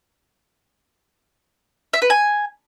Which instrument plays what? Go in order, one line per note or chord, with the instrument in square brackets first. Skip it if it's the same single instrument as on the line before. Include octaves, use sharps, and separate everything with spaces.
[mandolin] E5
B4
G#5